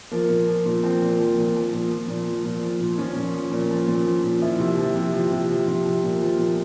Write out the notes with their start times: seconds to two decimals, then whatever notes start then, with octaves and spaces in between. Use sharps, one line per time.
0.12 F3 A#3
0.30 A#2
0.48 F3
0.66 A#2
0.84 F3 C4
1.02 A#2
1.20 F3
1.38 A#2
1.55 F3
1.73 A#2
1.91 F3
2.09 A#2
2.28 F3
2.45 A#2
2.63 F3
2.81 A#2
2.98 F3 C#4
3.16 A#2
3.34 F3
3.52 A#2
3.71 F3
3.88 A#2
4.05 F3
4.24 A#2
4.41 F3 E4
4.60 C3
4.78 F3
4.96 C3
5.14 F3
5.32 C3
5.49 F3
5.68 C3
5.85 F3
6.04 A#2
6.22 F3
6.39 A#2